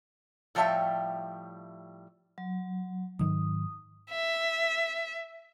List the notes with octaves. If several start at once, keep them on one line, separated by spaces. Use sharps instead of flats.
A2 F3 G3 C#5 E5 G5
F#3
G#2 D#3 F#3 D#6
E5